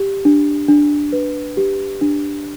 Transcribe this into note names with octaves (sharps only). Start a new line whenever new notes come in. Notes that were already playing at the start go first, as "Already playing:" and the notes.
Already playing: G4
D4
D4
B4
G4
D4